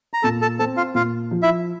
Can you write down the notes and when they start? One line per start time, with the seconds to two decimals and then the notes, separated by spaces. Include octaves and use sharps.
0.14 A#5
0.23 A#2 A4 A5
0.41 A4 A5
0.59 C4 A4 A5
0.77 F4 F5
0.95 A#2 F4 F5
1.31 F3
1.42 E4 E5